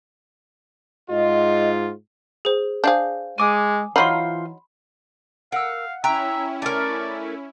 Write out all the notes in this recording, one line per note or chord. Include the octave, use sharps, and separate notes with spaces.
G#2 F4 D#5
G#4 C5
D4 G#4 C5 F5 G6
G#3 G#5 D6 D#6
E3 F#3 D#4 F4 C5 B5 C6
A#4 F5 F#5 E6
C#4 E4 E5 G5 A#5 C#6 F#6
A3 A#4 D5